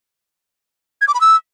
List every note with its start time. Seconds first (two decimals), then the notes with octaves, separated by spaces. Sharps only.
1.01 G#6
1.08 D6
1.14 B5
1.21 E6